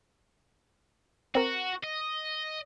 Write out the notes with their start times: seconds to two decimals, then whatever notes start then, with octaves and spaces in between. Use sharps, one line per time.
1.35 C4 F#4 A#4
1.83 D#5